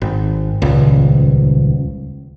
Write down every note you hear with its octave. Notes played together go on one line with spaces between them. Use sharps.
G#1
D#1 C#2